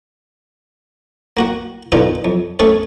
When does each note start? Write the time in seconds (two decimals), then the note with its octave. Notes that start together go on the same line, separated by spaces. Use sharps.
1.37 A#3 F#4 F#5
1.92 B2 D3 D#3 D#4 F4 B4
2.25 F2
2.59 A3 C#4 G#4 A4 C#5